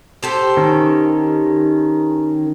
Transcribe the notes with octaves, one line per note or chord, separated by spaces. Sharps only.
G4 A4 C5
D#3 C#4